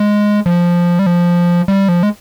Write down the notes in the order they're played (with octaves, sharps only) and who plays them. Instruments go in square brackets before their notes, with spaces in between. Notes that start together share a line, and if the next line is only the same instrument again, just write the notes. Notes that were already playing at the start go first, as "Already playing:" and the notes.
Already playing: [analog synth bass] G#3
F3
G3
F3
G3
F3
G#3